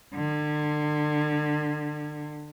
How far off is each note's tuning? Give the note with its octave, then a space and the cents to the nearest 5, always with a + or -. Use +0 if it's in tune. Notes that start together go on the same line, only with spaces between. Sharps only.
D3 +30